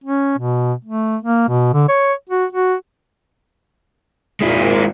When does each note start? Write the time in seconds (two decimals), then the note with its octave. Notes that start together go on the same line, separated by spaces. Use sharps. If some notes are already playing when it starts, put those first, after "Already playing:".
0.04 C#4
0.38 B2
0.85 A3
1.23 A#3
1.49 B2
1.74 D3
1.89 C#5
2.30 F#4
2.53 F#4
4.41 G#1 A#2 G#3 E4